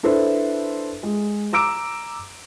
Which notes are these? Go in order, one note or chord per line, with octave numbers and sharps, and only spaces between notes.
D4 E4 A4 B4 C5
G#3
A#5 D6 E6 D7